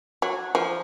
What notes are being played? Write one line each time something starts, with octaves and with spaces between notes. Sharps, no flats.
F#3
F3